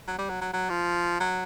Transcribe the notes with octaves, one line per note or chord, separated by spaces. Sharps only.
F#3
G3
F#3
F#3
F#3
F3
F#3